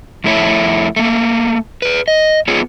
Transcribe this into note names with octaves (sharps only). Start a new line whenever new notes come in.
F2 A3 E4 C#5
A3 A#3
G#4 B4
D#5
B3 F4 G#4 C#5